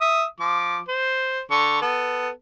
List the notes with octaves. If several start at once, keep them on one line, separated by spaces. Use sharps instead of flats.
E5 D#6
F3 D6
C5
D3 C#6
B3 A4